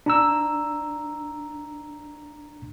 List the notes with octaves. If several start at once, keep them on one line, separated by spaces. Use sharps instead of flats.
D4 A#5 E6